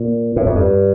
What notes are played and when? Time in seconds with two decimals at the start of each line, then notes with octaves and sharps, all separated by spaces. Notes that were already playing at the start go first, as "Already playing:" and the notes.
Already playing: A#2
0.36 A2
0.46 F2
0.55 G2